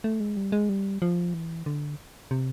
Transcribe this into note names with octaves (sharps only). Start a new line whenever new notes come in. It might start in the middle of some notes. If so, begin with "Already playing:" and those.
A3
G#3
G3
G#3
G3
F3
E3
D3
C3